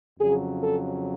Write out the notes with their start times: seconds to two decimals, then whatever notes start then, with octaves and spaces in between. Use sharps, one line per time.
0.19 F2 C#3 F#3 G#4
0.63 A4